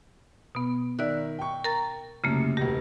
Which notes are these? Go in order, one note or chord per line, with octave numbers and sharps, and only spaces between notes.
B2 B3
D#3 D5 E5 F#6
G5 C#6
A#4 A#5 A6
C2 F#2 C#3 A3 A#3
E1 C#2 G4 A#6